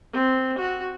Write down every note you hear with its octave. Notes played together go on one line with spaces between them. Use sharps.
C4
F#4